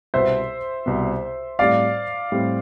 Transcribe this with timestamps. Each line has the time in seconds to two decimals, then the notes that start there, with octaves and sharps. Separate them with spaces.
0.14 C2 B2 B3 C5 E5
0.86 C2 B2 B3
1.59 A2 G3 C4 D5 F5
2.32 A2 G3 C4